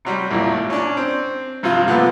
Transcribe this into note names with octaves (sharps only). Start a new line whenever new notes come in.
C3 F#3 G3
A1 D#2 A#2
C#4 D4
C4
G2 C3 F3 F4
A#2 D3 F3 A3 B3